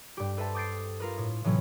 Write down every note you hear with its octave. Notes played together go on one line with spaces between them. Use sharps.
G2 G4
A4 B4 C5 E5 A5
D6 D#6 G6 A6 C7 D7
F4 A#4 B4
A2
A2 C3 E3 F#3 B3 C#4